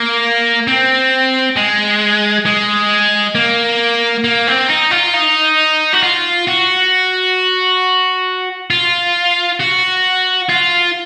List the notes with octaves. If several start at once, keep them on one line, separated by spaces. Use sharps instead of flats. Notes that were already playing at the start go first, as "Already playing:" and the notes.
Already playing: A#3
C4
G#3
G#3
A#3
A#3
C4
D#4
F4
D#4
F#4
F4
F#4
F4
F#4
F4